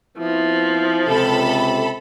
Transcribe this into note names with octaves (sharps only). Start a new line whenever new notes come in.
F3 B3 C4 E4
C#2 C3 A4 B5